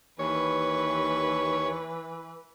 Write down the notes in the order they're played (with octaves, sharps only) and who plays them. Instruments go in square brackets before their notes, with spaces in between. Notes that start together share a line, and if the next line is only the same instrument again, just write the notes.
[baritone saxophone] D#2 [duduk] E3 [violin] B4 [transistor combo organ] C#5